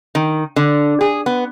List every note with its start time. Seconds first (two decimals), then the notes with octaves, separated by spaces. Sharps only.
0.15 D#3
0.56 D3
1.01 G#4
1.26 B3